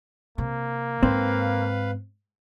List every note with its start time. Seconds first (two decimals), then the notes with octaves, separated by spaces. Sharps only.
0.38 C3 A#3
1.03 G#2 C4 B4 F5